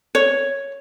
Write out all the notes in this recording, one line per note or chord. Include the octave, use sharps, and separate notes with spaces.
C#5